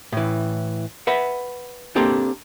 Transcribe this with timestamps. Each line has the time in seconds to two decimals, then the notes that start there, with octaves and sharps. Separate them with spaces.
0.13 A2 E3
1.07 B4 E5 F#5
1.96 A#3 C4 D4 G4 A4